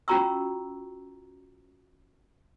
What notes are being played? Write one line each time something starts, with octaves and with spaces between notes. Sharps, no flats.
C#4 F4 F#4 A#5 C#6 E6